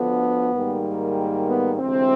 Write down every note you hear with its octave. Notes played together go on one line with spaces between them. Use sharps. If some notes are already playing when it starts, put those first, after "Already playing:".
Already playing: D2 D3 F3 B3
G#2 D#3 G3 A#3
B3
D2 C3 E3 G#3 C4